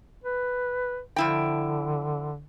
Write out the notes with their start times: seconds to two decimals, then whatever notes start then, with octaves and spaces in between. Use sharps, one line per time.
0.24 B4
1.16 D3 F3 E4 G5